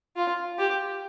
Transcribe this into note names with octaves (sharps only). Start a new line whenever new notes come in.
F4
G4